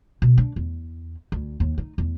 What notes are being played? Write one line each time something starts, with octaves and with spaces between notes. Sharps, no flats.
B2
D4
E2
D2
D#2
D#4
E2